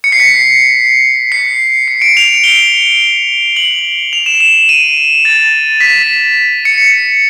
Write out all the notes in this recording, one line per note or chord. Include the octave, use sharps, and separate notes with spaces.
C#7
C7
B6
C7
C#7
D7
F7
G7
F#7
F7
E7
E7
D#7
A6
B6
C#7